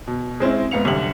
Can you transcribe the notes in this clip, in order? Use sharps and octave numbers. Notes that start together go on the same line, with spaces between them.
B2
G#3 C4 C#4 E4
G#2 B3 F5 C#7 F7
C2 F#2 D3 G4 E5 F#7